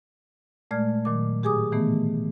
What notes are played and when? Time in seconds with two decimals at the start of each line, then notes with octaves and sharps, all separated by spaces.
0.71 A#2 G#3 A3 D5 F6 G#6
1.05 A#2 D#3 F#3 D6
1.43 A2 G4 G#4 G#5 D6 D#6
1.72 B2 D#3 E3 A3 B3